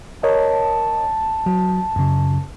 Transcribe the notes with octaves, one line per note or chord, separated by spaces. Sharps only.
A#4 C#5 D#5 A5
F#3
F#2 C#3